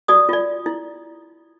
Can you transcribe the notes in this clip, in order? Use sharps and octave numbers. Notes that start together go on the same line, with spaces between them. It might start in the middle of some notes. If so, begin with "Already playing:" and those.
F#4 D5 D#6
F4 D5
E4